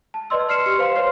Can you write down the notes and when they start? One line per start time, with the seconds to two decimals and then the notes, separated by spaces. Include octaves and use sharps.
0.14 A5
0.30 B4 D5 D#5 C6 E6
0.49 C6 F6 C7 C#7 E7
0.66 G4 C#7
0.78 B4 C5 F5 C6
0.96 B4 C#5 F6 C7